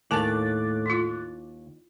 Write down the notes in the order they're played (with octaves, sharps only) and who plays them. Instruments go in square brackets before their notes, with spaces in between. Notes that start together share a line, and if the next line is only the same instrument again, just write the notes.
[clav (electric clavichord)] D#2 [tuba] A2 [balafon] A#4 G#5 A5 [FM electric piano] D6 F#6 A6
[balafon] E4 F4